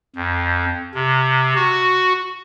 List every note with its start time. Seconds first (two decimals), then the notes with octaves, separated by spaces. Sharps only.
0.16 F2
0.94 C3
1.55 F#4